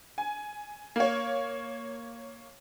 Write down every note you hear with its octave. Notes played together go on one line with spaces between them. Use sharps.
G#5
A#3 C#5